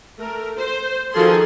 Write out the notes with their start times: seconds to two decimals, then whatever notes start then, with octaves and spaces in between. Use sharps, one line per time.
0.18 A3 A#4
0.57 C5
1.12 D#3 F3 F#4 G#4 A4 C6